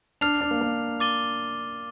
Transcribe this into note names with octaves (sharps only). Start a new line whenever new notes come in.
D4 F6 C7 F7
D4
A#3
A#3
D6 A6 D#7 G7